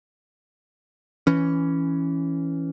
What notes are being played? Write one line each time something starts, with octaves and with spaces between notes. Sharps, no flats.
E3 C#4